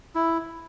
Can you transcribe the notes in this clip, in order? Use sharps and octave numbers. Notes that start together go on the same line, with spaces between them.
E4